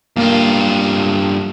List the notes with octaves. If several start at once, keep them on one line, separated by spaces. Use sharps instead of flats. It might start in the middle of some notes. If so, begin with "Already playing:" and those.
G2 A#3 F4